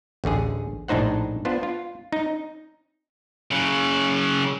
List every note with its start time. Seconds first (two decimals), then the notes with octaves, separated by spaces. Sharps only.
0.24 A1 D2 D3 G#4
0.88 A#1 A2 D4 D#4 C5 F#5
1.45 B3 D4 F4 C5
1.63 F4
2.12 D#4
3.51 C#3 F#3